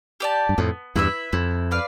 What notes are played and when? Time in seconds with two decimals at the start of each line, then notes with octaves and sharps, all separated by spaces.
0.20 G4 D5 A5
0.49 G2
0.58 F2 A2 B3
0.95 E2 G2 E4 B4 E5
1.33 F2 E4
1.71 B4 D5 F5